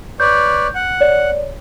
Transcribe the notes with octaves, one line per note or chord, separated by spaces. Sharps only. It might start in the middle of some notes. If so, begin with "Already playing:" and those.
B4 C#5 D5 G6
F#5
C#5 D5